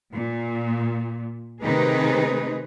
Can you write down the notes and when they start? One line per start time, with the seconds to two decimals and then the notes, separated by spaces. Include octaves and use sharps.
0.13 A#2
1.62 C3 D#3 A3 D#4 G#4 B4